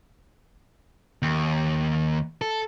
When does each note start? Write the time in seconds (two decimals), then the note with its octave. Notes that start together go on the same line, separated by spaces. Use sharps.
1.22 D#2
2.42 A4